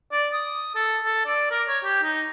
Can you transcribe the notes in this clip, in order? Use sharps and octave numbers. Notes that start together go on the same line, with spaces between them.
D5
D#6
A4
A4
D5
A#4
C#5
G4
D#4